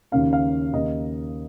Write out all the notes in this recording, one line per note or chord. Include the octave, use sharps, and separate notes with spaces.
D#2 C#3 A#3 C#4 F5
F5
D#2 C#3 A#3 D#4 D#5